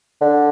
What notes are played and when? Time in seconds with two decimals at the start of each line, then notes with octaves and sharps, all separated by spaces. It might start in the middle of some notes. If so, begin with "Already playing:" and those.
0.21 D3